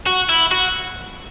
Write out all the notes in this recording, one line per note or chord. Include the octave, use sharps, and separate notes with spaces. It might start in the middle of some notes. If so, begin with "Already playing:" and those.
F#4
E4
F#4